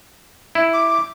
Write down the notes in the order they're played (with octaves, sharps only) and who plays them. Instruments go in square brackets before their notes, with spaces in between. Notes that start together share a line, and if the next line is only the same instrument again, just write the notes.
[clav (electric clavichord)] E4
[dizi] D6